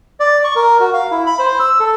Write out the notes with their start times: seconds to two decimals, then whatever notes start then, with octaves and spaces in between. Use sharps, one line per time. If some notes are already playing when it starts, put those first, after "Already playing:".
0.20 D5
0.44 C#6
0.56 A#4
0.80 F#4
0.93 F5
1.11 E4
1.26 B5
1.39 C5
1.59 E6
1.80 A4